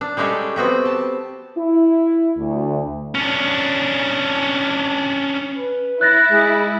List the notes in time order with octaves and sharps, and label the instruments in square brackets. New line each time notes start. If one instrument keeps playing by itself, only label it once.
[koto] D4
G3 G#3 C#4 G4 A4
B3 C4 F#4 G4
A5
[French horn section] E4
D2
[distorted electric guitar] C#4 D4
[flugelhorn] B4
[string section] E4 [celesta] F#6 A6 A#6
[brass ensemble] G#3 [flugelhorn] G#4